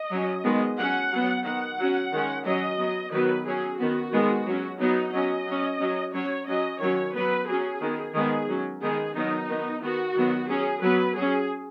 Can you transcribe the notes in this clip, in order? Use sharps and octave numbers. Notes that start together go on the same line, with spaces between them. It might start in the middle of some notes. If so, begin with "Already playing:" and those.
Already playing: D#5
F#3 C#4
D#3 G#3 B3
F#3 C#4 F#5
F#3 B3
D#3 B3 F#5
F#3 C#4
D#3 G#3 C#4
F#3 C#4 D#5
F#3 B3
D#3 F#3 B3 B4
F#3 C#4 G#4
D#3 B3 F#4
D#3 G#3 B3
F#3 C#4
F#3 B3 D#4
F#3 C#4 D#5
F#3 C#4
F#3 C#4
F#3 C#4 C#5
F#3 C#4 D#5
D#3 F#3 C#4 C#5
F#3 B3 B4
F#3 C#4 G#4
D#3 B3
D#3 G#3 B3 G#4
F#3 C#4
D#3 G#3 B3 G#4
D#3 F#3 B3 D#4
D#3 B3
D#3 B3 F#4
D#3 F#3 B3
F#3 C#4 G#4
F#3 B3 B4
F#3 G#4
C#4